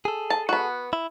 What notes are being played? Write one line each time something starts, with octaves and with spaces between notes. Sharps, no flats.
G#4 A4
A5
B3 F#4
E4